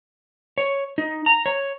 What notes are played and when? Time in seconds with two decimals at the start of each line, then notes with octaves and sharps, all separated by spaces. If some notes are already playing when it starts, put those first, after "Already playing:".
0.58 C#5
0.98 D#4
1.26 A#5
1.46 C#5